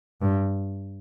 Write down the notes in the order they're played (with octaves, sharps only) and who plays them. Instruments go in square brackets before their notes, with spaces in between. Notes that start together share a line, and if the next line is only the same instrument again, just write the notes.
[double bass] G2